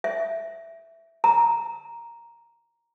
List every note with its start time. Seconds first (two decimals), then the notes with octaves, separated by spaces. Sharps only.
0.04 E5
1.24 A#5